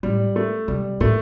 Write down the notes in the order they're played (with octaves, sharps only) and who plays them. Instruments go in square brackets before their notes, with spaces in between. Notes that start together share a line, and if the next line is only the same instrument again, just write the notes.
[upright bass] A2 [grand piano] G3
[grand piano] A3
[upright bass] C3 [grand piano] G3
[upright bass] A2 [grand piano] A3